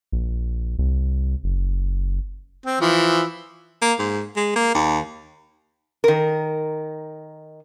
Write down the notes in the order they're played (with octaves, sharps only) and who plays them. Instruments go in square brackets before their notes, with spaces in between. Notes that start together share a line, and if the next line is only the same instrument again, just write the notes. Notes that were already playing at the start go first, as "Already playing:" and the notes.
[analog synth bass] A#1
C2
F#1
[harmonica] C4
E3 F3
[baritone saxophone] A#3
G#2
G#3
A#3
D#2
[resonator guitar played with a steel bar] D#3 A#4